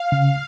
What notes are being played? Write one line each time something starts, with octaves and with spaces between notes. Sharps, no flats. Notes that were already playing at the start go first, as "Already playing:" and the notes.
Already playing: F5
C#3